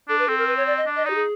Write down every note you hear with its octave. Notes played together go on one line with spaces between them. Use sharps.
D4 A4
B4
C4 A4
A#4
B4
C#5
D5
D#5
D4
D#5
D#4 G4 D5
G#4